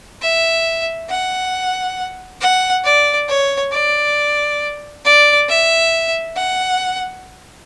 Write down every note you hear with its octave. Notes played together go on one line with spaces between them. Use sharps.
E5
F#5
F#5
D5
C#5
D5
D5
E5
F#5